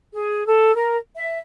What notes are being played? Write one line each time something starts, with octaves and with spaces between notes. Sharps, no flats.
G#4
A4
A#4
E5